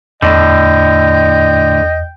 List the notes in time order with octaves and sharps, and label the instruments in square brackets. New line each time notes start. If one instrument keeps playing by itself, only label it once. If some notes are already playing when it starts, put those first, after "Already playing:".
[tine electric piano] E2 [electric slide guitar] A2 D3 [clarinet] D#5 [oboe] G5